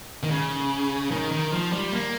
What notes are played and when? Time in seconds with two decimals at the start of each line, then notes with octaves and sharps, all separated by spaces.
0.23 D#3
0.31 C#3
1.11 D#3
1.32 D#3
1.52 F3
1.73 G3
1.92 A#3